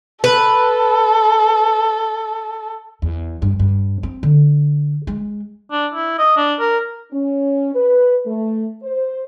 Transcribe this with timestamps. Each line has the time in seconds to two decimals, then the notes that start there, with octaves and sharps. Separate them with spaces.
0.24 A4 B4
3.02 E2
3.42 G2
3.60 G2
4.03 C4
4.23 D3
5.07 G#3
5.72 D4
5.94 E4
6.18 D#5
6.37 D4
6.60 A#4
7.12 C#4
7.74 B4
8.25 A3
8.83 C5